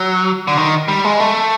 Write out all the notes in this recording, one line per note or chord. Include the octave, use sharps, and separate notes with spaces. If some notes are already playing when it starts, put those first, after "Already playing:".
Already playing: F#3
D3
D#3
G3
G#3
A3